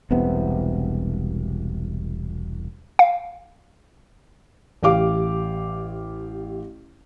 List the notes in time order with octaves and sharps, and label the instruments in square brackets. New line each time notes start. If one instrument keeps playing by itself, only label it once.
[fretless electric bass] E1 C2 C3 B3
[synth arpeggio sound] F5
[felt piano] A1 G4 F5 D6